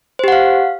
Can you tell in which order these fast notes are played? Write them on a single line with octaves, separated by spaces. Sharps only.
C5 G4 F#5 F5